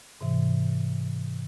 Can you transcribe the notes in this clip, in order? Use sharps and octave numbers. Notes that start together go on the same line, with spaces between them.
G#2 C3 E3